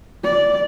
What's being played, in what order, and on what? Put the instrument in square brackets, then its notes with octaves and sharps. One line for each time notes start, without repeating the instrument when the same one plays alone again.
[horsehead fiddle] D5